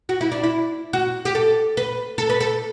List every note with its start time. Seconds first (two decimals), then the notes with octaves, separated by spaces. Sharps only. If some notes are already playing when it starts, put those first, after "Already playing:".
0.09 F#4
0.21 E4
0.32 D4
0.44 E4
0.93 F#4
1.25 G4
1.35 A4
1.77 B4
2.18 A4
2.30 B4
2.41 A4